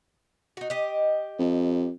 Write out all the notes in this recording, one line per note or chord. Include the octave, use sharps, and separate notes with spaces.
D#4 F#4
G4 D#5
F2